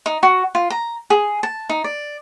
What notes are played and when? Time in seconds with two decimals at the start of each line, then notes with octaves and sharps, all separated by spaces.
0.06 D#4
0.23 F#4
0.55 F4
0.70 A#5
1.10 G#4
1.43 A5
1.69 D#4
1.84 D5